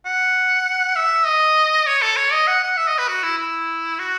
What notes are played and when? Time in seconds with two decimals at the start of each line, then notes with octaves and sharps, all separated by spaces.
0.06 F#5
0.95 E5
1.26 D#5
1.87 C#5
2.02 A4
2.17 C#5
2.32 D#5
2.47 F#5
2.63 F#5
2.77 E5
2.88 D#5
2.98 B4
3.08 F#4
3.23 E4
3.38 E4
3.99 F#4